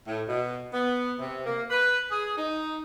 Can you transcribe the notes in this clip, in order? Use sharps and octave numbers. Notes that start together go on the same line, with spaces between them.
A2
B2
B3
C3
A#3
B4
G#4
D#4